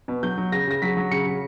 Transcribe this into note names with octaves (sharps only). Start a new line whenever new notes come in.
B2
F#3 G6
F#3
C#3 A#6
C#3 A#6
F#3 B6
F#3
C#3 C#7
C#3